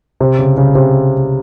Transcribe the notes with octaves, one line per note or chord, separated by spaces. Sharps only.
C3
C#3
C#3
C3